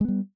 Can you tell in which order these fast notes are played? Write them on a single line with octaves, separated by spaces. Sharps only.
G#3 B3 G3